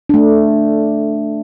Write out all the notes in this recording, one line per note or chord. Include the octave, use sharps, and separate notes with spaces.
A3 D4